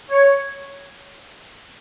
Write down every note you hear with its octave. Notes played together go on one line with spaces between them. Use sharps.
C#5